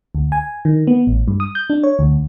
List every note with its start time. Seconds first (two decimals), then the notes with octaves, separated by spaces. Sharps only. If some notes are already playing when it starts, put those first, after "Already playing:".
0.15 D2
0.32 G#5
0.65 D#3
0.87 B3
1.07 A1
1.28 G2
1.40 D#6
1.55 G6
1.70 D4
1.83 C#5
1.99 D2